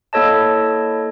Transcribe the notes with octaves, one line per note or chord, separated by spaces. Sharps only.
A#3 E4 A4 C#5 D#5 A5